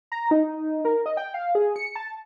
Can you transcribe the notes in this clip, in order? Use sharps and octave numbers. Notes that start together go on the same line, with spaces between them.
A#5
D#4
A#4
D#5
G5
F5
G#4
C#7
A5